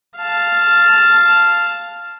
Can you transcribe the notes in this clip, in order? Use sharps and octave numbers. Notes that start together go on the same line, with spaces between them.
F5 A5